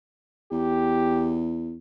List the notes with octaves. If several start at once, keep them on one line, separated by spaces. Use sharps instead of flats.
E2 G4